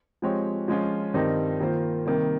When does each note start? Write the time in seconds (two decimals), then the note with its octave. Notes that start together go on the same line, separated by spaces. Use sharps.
0.22 F3 G#3 C4 G4 C#5
0.68 F3 G#3 C#4 F4
1.14 G2 D#3 G3 C4 D#4
1.61 D#3 A#3 F4 C5
2.06 C3 D#3 G3 A#3